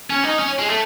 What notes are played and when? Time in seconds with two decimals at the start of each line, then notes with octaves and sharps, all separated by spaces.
0.10 C#4
0.25 D#4
0.39 C#4
0.59 G#3
0.69 A3